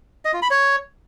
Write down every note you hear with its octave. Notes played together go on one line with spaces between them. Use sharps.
D#5
F4
B5
C#5